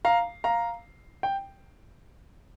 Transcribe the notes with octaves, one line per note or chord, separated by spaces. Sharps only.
F5 A#5
F5 A#5
G5